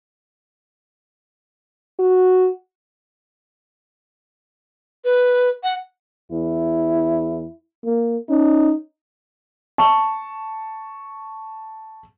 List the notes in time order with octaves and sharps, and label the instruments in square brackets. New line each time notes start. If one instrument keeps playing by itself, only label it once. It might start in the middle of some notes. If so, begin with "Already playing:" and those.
[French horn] F#4
[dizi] B4
F#5
[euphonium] E2 [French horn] E4
[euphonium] A#3
[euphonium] C#4 [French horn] D#4
[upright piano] A5 C#6